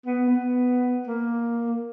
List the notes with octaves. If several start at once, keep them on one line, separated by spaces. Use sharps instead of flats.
B3
B3
A#3